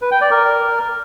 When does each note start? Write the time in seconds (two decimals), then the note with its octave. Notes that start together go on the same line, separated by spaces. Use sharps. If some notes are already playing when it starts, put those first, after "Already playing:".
0.02 B4
0.11 G5
0.21 D5
0.31 A#4